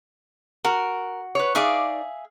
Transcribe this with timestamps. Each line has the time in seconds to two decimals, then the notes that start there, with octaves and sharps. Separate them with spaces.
0.65 F#4 A#4
1.35 B4 C#5
1.55 D#4 G#4 D5 E5 F5